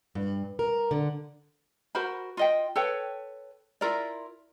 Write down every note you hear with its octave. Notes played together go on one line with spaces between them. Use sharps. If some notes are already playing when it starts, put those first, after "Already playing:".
G2
A#4
D3
F#4 A#4 C5 B5
F4 D#5 G5
A4 B4 C#5 G5
E4 F4 A#4 D5